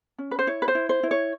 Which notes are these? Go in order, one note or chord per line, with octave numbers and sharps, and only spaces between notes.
C#4
B4
C5
E4 C#5
B4
C5
E4
C5
E4
C#5